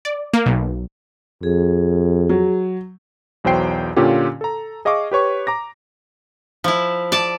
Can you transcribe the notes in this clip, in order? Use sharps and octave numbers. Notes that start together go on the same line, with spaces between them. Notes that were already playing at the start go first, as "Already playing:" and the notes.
D5
A#3
B1
F2 G#4
F#3
B1 E2 F#3 C5 G5 C7
A#2 D3 C#4 F4 G4
A4 A#5
G#4 D#5 F5 C#6 D6
G4 B4 C#5 C#6
A#5 D6 A#6
F3 E4
D5 A5